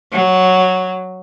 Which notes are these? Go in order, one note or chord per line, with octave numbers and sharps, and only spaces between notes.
F#3